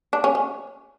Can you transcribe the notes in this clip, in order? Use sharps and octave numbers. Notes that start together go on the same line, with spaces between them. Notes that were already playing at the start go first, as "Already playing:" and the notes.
D4
C#4
C#4